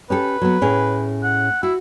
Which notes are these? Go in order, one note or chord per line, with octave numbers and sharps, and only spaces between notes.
C#4 G4 A4 B4
F#3 B3
A2 C#4 G#4
F#5
E4 F#4